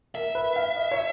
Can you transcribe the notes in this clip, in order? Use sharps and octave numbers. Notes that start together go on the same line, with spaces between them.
A#4 E5
B4
F5
D#5
C#5